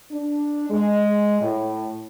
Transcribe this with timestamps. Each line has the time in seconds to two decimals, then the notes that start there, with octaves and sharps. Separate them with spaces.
0.11 D4
0.70 G#3
1.41 A2